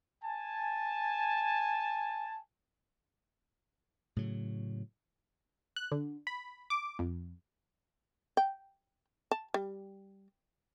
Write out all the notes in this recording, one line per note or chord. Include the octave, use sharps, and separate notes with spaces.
G#5 A5
A2 C#3 F#3
F#6
D3
B5
D6
F2
G5
A5
G3